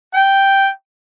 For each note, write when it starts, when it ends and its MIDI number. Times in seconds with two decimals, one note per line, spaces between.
0.14 0.70 79